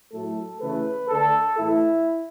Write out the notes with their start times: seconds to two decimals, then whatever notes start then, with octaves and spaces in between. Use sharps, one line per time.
0.12 A2 F#3 A3 A4
0.61 C#3 E3 A3 B4
1.09 D3 A3 A4
1.58 A2 E3 A3 E4